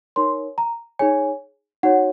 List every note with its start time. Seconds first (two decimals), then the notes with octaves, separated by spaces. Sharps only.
0.16 D#4 A#4 C#5 C6
0.58 A#5
0.99 D#4 G#4 C#5 G#5
1.83 D#4 F#4 C#5 F#5